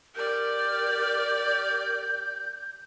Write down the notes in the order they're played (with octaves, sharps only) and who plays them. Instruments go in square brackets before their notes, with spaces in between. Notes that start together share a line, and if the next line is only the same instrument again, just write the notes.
[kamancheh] G4 D5 [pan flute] A#4 [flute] G6